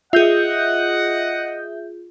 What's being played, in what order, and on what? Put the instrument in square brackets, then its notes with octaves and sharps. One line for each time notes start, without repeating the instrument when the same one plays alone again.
[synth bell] F4 G#4 [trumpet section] D#5 F#5 [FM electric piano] E5 G6